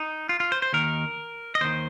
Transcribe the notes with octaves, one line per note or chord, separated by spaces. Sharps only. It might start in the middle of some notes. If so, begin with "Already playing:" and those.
Already playing: D#4
F4
F4
C5
C5
D#2 D#3 A#4
D#5
D#2 D#3 C5